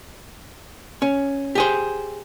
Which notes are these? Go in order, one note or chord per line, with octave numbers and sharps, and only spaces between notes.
C#4
G4 G#4 C5